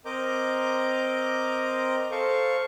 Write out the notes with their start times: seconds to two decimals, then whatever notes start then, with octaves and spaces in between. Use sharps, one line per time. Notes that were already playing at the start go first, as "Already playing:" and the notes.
0.06 C4 A#4 D#5 A#5 D6 G6
2.11 A4 C5 F5 C#6